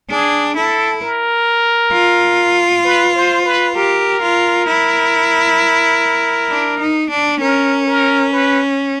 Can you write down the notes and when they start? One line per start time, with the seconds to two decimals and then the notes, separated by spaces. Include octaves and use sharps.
0.10 D4 G#4
0.56 E4 A4
1.02 A#4
1.93 F4
2.85 B4
3.15 C5
3.45 B4
3.75 G4 A#4
4.21 F4
4.67 E4
6.50 D4
6.80 D#4
7.10 D4
7.41 C#4 A#4
7.87 A#4
8.33 B4